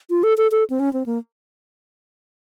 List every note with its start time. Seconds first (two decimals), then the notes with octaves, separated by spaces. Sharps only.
0.10 F4
0.23 A4
0.38 A4
0.51 A4
0.70 C4
0.80 C#4
0.93 C4
1.06 A#3